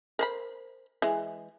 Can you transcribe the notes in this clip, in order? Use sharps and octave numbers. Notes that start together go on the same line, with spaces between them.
A#4 C5 B5
E3 G#3